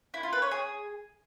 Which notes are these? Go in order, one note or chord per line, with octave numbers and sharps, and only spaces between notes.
E4
F4
B4
C#5
G#4